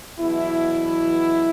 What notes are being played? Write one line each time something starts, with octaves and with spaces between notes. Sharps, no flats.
E2 B2 F#3 E4